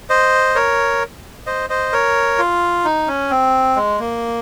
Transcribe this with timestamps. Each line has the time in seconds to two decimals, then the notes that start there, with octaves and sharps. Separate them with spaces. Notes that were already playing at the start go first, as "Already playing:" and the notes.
0.10 C5 D#5
0.55 A#4 C#5
1.47 C5 D#5
1.70 C5 D#5
1.93 A#4 C#5
2.38 F4
2.85 D#4
3.07 C#4
3.30 C4
3.76 G#3
3.99 A#3